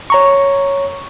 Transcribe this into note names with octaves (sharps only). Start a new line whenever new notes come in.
C#5 A#5 C#6